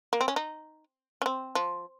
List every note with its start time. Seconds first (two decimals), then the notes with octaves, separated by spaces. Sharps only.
0.13 A#3
0.21 C4
0.28 C#4
0.36 D#4
1.22 C#4
1.26 C4
1.55 F3